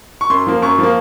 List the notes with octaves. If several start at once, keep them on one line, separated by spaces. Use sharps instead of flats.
C#6
F#2 C6
F3 A#3
F#2 C#6
F3 A#3